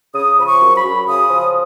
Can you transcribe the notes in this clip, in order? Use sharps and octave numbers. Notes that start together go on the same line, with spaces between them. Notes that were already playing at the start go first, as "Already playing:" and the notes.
C#3 D#6
F3 B5
C#6
F#2
B5
F#2
C#3 D#6
F3